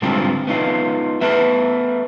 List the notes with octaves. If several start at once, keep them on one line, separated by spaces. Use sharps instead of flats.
G#2 D3 G3 C4 F4 G4
B3 D#4 F4
A3 B3 B4 E5